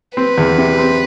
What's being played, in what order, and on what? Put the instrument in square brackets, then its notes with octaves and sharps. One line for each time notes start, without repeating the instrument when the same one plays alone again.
[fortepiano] C4 [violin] B4
[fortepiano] E2
C3
C4